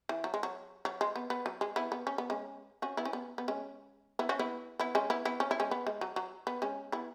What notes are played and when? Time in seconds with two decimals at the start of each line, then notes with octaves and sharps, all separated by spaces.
0.09 E3
0.24 F#3
0.34 G#3
0.43 F#3
0.85 F#3
1.01 G#3
1.16 B3
1.30 B3
1.46 F#3
1.61 G#3
1.76 B3 E4
1.92 B3
2.07 C#4
2.18 B3
2.30 G#3 C#4
2.82 C#4 F#4
2.97 B3 E4
3.05 C#4
3.13 B3
3.38 B3
3.48 G#3 C#4
4.19 B3 E4
4.29 C#4 F#4
4.39 B3 E4
4.79 B3 E4
4.95 G#3 C#4
5.10 B3 E4
5.25 B3 E4
5.40 C#4
5.51 E4
5.60 G#3 C#4
5.71 B3
5.87 G#3
6.01 F#3
6.16 F#3
6.47 B3
6.62 G#3 C#4
6.92 B3 E4